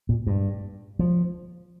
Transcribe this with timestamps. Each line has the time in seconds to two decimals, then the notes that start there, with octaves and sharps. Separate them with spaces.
0.09 A#2
0.27 G2
0.99 F3